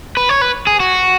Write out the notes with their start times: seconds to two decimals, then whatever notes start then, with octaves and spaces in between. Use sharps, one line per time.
0.17 B4
0.29 C#5
0.41 B4
0.67 G#4
0.80 F#4